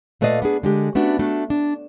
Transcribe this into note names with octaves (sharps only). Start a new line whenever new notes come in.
A#2 A3 B4 D5 D#5 F5
B3 D4 G#4
D3 G#3 G4
A3 B3 C#4 D4 F#4
A3 D4 F#4
D4